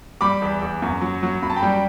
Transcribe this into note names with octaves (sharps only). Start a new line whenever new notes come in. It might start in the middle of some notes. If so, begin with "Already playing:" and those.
G3 B5 D6
E2
E2
F#2
F#3
F#3
F#2 B5
A5
G5 B5
G3